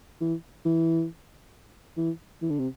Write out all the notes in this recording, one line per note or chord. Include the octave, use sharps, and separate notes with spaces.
E3
E3
E3
E3
D3
C3